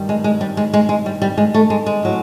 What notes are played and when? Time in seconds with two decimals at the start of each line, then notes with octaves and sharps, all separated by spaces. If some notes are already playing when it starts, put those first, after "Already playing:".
Already playing: G2 D#3 G3
0.09 G#3
0.24 G#3
0.41 G3
0.57 G#3
0.74 G#3
0.89 G#3
1.06 G3
1.22 G3
1.38 G#3
1.54 A3
1.70 G#3
1.86 G#3
2.03 A2 F#3